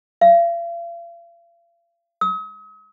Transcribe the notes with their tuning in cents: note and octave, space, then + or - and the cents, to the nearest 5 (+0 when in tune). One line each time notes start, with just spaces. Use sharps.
F5 -40
D#6 +45